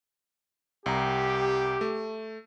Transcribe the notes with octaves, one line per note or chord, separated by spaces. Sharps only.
C2 G4 A#5
A3